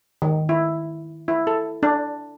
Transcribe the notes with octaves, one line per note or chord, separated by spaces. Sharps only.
D#3
E4
E4
A4
D4